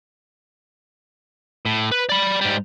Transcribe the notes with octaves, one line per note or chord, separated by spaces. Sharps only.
A2
B4
D5 B5
G#2 G3